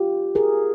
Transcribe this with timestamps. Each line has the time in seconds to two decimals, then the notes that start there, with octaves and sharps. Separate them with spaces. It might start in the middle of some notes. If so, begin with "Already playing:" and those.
Already playing: F4 G4
0.35 G#4 A#4